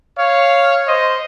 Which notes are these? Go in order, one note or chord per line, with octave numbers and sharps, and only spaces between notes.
C#5 F5
C5 D#5